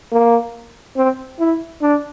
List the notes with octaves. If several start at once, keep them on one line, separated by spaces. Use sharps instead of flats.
A#3
C4
E4
D4